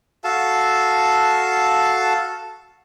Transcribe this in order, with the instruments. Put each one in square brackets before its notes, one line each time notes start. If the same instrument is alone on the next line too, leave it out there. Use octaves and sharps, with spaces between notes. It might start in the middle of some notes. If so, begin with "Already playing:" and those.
[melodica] F#4 A4 F5 A5